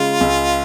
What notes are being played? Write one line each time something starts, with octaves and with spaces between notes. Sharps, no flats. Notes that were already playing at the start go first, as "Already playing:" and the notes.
Already playing: C#3 G#3 F4
C#2